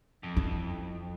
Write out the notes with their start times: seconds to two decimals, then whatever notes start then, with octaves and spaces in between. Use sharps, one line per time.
0.23 F2
0.37 E4